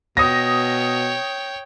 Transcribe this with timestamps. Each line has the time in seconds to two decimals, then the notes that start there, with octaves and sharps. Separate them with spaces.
0.17 B2 C#5 G5 D#6 A#6